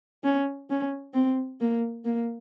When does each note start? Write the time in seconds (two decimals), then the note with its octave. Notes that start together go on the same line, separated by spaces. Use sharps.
0.24 C#4
0.70 C#4
1.14 C4
1.61 A#3
2.05 A#3